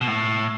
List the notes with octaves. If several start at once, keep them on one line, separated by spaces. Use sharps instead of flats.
B2
A2